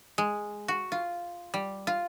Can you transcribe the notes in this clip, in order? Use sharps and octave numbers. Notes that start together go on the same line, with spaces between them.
G#3
F#4
F4
G3
F4